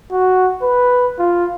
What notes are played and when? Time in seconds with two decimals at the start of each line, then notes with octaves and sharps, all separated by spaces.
0.12 F#4
0.62 B4
1.19 F4